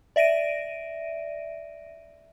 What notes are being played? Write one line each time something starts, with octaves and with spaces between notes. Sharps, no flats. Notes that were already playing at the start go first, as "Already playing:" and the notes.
D5 E5 A#6 D7 D#7